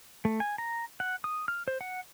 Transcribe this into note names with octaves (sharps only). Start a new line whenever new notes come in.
A3
G#5
A#5
F#5
D#6
F6
C5
F#5